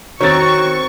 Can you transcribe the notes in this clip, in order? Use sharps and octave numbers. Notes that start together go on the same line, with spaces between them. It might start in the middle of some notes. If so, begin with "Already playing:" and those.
D#3 C4 F#4 C#5 C#6 A6